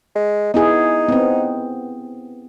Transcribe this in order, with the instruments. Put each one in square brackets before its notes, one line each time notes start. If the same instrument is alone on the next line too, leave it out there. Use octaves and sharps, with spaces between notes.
[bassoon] G#3
[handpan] B3 E4 G#4 [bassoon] D#4
[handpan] B3 C4